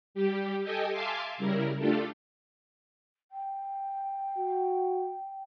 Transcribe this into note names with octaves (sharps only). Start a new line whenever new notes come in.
G3 G4
G4 A4 D#5 G5 G#5
E5 F5 G#5 A5 C6 D6
C#3 G3 E4 A#4
A3 D4 F4 G4 A4
G5
F#4